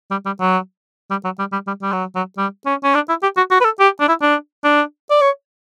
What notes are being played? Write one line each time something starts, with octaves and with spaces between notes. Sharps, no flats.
G3
G3
F#3
G3
F#3
G3
G3
G3
G3
F#3
F#3
G3
C#4
C#4
D4
E4
G4
F#4
F#4
B4
A4
G4
D4
E4
D4
D4
D5
C#5